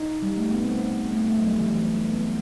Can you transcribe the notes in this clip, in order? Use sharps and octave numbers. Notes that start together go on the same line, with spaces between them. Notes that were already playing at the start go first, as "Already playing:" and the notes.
Already playing: D#4
G3
A3
B3
C4
A3
A3
F#3
G3
E3
B3